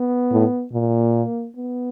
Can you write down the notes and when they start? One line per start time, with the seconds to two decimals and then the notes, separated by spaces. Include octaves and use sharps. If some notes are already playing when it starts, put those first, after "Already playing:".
Already playing: B3
0.32 A2
0.73 A#2 A#3
1.56 B3